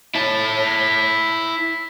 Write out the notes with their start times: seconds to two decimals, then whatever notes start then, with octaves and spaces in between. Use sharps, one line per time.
0.15 E4 A5